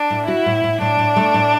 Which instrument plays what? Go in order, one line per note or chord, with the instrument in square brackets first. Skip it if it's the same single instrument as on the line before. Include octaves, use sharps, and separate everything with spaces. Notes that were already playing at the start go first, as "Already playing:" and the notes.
Already playing: [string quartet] D4
[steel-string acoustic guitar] A2
[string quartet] E4 [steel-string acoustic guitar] F#4
[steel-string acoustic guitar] A2
A2
[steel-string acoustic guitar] A2 [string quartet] D4
[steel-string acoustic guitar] A2
A3
A2